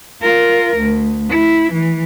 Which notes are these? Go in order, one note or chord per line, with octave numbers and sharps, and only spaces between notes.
F4 A#4
D2
E4
E3